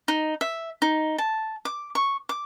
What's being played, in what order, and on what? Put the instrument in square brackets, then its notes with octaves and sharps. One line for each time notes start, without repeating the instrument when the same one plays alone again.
[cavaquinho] D#4
E5
D#4
A5
D6
C#6
D6